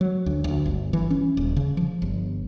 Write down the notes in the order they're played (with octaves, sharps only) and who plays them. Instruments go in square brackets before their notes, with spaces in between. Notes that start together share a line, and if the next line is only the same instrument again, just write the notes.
[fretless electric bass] F#3
D2
D2
G1
E3
C#4
D#1
C#3
F3
G1